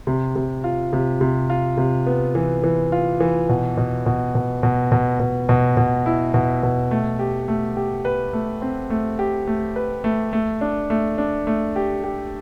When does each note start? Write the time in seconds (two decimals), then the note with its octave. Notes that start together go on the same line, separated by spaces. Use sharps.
0.07 C3
0.36 C3
0.64 F4
0.93 C3
1.21 C3
1.50 F4
1.77 C3
2.06 B3
2.35 E3
2.63 E3
2.92 F4
3.20 E3
3.49 B2
3.77 B2
4.06 B2
4.35 B2
4.63 B2
4.92 B2
5.20 B2
5.49 B2
5.77 B2
6.06 E4
6.34 B2
6.63 B2
6.91 A3
7.19 G4
7.48 A3
7.77 G4
8.05 B4
8.33 A3
8.62 C4
8.90 A3
9.19 G4
9.47 A3
9.76 B4
10.04 A3
10.33 A3
10.61 D4
10.90 A3
11.18 D4
11.47 A3
11.76 G4
12.04 G4